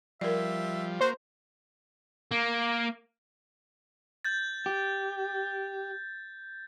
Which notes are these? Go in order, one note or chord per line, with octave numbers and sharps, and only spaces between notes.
F3 G3 A#4 D5 E5
A#3 F#4 C5
A#3
G6 A6
G4